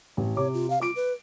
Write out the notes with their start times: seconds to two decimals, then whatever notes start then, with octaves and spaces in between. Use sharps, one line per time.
0.17 A1
0.36 C3 C#5 D6
0.54 F4
0.70 F5
0.81 F4 D6 D7
0.96 B4